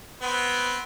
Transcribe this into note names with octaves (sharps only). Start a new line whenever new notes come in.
B3 C4